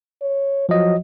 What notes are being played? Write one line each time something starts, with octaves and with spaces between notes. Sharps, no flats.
C#5
F3 F#3 D#5